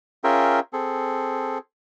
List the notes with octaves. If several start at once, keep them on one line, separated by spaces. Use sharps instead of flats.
C#4 F4 G#4 A#4 E5 G5
C4 G#4 A4